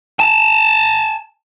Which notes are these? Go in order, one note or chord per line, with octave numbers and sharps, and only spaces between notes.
G#5 A5